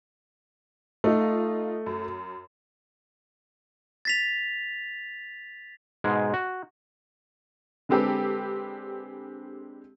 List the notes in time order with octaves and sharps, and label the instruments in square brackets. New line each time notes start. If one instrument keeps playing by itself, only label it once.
[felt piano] A3 [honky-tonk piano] D#4 F4
[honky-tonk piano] F#2
[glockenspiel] A6 B6 F7
[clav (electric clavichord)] G#2 B2 G#3
F#4
[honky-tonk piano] D3 G#3 C4 G4 A4 B4